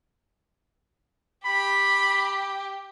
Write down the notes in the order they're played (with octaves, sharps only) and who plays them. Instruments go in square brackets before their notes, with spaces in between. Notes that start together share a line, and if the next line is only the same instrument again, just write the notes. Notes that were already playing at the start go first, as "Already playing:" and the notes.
[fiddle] G4 [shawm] B5